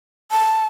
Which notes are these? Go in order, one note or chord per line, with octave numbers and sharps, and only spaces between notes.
A5